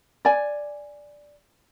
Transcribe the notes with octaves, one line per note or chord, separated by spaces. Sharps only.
D5 G#5